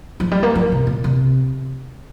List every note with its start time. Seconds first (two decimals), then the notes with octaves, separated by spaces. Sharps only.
0.20 F3
0.31 G3
0.43 A#3
0.55 F3
0.72 C3
0.87 A#2
1.04 C3